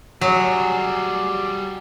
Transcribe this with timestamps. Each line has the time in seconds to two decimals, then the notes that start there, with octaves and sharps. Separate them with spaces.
0.21 F#3 G3 G#4